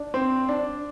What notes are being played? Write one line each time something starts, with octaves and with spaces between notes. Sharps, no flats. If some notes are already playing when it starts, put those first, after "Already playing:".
Already playing: D4
C4
D4